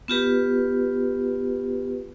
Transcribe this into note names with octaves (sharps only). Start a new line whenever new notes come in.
B3 F4 G4 B4